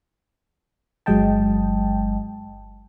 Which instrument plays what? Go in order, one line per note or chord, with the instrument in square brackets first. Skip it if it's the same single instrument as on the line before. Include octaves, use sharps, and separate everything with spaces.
[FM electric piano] G1 F#3 G#3 D#5 G5 A5